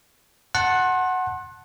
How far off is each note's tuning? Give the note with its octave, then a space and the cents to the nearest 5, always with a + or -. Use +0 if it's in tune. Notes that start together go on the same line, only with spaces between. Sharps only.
F#5 +0 A5 +0 C6 +35